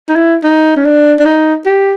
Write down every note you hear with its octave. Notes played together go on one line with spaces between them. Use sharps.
D#4
E4
D#4
C#4
D4
D4
D#4
G4